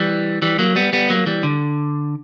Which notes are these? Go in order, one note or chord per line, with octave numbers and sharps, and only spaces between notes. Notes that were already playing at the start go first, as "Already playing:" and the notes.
Already playing: E3 G3
E3 G3
F#3 A#3
G3 B3
G3 B3
F#3 A#3
E3 G3
D3